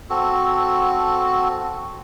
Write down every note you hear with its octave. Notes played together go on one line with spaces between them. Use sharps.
C4 F#4 A4